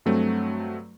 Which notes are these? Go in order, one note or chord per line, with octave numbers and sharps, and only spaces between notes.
G2 F#3 A3 C4